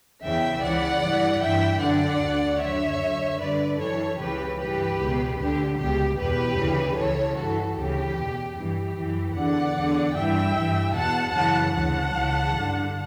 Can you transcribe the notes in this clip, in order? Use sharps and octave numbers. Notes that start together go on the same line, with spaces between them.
E2 C#3 E3 E5 G5
C#2 C#3 E3 D5 F#5
G2 E3
G2 E3 E5 G5
F#2 D3 D5 F#5
D2 D3
F#2 D3 C#5 E5
F#2 D3
G2 D3 B4 D5
F#2 E3 A4 C#5
C#2 C#3 E3 G4 B4
G2 E3 G4 B4
C#2 B2
D2 D3 G4
C#2 B2 G4
E2 B2 G4 B4
D2 C#3 E3
C#2 C#3 E3 A4 C#5
G2 E3 F#4 A4
D2 C#3 E3 G4
E2 B2
G2 E3 G4
F#2 E3
E2 D3 D5 F#5
E2 D3
G2 E3 E5 G5
G2 E3
E2 B2 F#5 A5
F#2 C#3 E3 F#5 A5
D2 C#3 E3 F#5 A5
C#2 C#3 E3
G2 D3